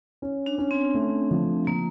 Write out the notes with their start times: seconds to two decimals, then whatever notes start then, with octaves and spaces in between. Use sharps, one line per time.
0.22 C#4
0.46 D4
0.58 C#4
0.71 C4
0.94 A3
1.31 F3
1.67 F3 A#3